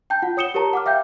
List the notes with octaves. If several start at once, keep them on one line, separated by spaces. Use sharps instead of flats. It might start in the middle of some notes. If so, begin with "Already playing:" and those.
G5 A5 G6
F4 F#5
C#5 D#6 C#7 E7 G7
G4 A#4 C#5 A5 A#5
F#5 D6 F6
E5 F5 G5 G6